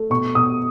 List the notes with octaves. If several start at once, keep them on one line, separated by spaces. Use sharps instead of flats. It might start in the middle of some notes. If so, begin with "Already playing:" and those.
Already playing: A3
B2 C#6
B2 D#6